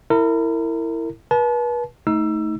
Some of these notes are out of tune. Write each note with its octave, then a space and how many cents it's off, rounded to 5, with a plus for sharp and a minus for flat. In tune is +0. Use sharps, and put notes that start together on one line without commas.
E4 +0 A#4 -30
B4 -40 A5 -35
A3 +0 D#4 +25 E6 +20